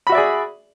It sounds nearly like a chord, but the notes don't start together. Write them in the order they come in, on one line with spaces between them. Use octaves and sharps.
B5 F#4 E5 D5 G#4